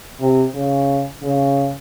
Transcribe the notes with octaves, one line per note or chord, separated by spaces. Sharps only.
C3
C#3
C#3